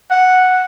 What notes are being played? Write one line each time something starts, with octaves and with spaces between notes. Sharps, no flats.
F#5